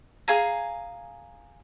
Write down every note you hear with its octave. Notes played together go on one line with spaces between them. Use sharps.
G#4 F5 G#5 A#5